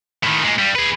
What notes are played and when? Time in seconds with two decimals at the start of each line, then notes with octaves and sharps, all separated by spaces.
0.23 A2 D#3
0.43 A#2 G#3
0.59 G2 G3
0.76 G#4 B4